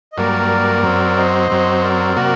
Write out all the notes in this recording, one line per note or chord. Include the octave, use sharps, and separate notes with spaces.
D#5
G2 F#3 A#3 A#4 D5
F#2 F#3 C4
C5 D#5
F#2 F#3 C4
A#4 D5
C3 F#3 A#3 F#4